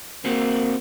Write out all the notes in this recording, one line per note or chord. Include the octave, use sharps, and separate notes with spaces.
A#3 C4 F#4